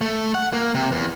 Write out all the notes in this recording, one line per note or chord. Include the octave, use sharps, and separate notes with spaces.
A3
F#5
A#3
C3
E2